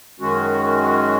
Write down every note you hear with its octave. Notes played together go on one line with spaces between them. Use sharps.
F#2 D#3 G#3 C#4 F#4